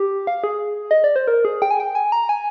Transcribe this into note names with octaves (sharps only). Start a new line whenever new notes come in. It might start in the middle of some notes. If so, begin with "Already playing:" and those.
Already playing: G4
F5
G#4
D#5
D5
C5
A#4
G#4
G5
G#5
G5
G#5
A#5
G#5